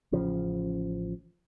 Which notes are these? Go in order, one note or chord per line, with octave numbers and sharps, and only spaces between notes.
A1 C#3 F3